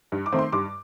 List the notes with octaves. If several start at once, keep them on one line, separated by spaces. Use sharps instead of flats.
G2
D6
D#3 A3 C4
C6
G2 D6